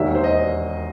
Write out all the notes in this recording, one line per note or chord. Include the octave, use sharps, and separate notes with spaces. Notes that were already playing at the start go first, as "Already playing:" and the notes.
Already playing: E1 D#2 D#3 E5
C5
D#5